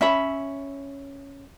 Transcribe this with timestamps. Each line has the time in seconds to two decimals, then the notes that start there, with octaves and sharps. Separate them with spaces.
0.01 C#4 E5 B5